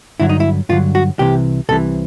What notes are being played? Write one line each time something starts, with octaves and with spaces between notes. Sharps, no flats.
G2 D3 F#3 E4
D#4
E4
G2 D3 F#3 F4
F#4
C2 C3 E3 G4
C2 C3 E3 A4